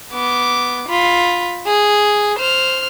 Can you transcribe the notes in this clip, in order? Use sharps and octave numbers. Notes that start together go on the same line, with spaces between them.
B3 D6
F4 B5
G#4
C5 F6